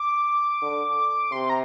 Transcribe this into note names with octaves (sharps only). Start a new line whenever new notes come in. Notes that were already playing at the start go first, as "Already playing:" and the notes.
Already playing: D6
D3
C3 C6
A#5